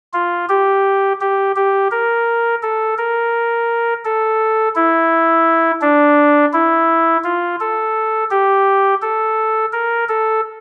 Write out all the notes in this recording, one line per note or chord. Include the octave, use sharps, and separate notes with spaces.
F4
G4
G4
G4
A#4
A4
A#4
A4
E4
D4
E4
F4
A4
G4
A4
A#4
A4